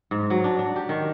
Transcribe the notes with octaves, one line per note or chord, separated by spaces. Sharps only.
G#2
F#3
D4
D4
G4
D#3